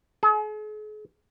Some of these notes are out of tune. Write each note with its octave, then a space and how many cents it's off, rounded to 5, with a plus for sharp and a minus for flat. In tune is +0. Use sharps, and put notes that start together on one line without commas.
G#4 +45